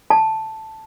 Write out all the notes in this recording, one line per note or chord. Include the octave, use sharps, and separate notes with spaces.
A5